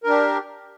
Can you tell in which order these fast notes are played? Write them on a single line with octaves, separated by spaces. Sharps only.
A#4 D4 G4